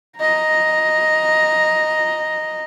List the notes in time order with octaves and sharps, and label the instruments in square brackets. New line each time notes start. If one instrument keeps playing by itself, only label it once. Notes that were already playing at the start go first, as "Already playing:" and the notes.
[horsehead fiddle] D#5 A#5